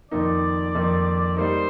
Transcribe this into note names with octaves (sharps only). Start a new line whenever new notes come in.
F2 D#3 A#3 D#4 D5
F2 D#3 A#3 D#4
G3 A#3 D#4 C5